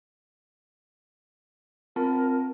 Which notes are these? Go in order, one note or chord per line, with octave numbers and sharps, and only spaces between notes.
C4 F4 A#4 A5